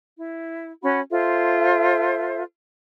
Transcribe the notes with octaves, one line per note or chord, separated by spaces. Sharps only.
E4
C#4 F#4 F#5 B5
F4 A4 C5 E5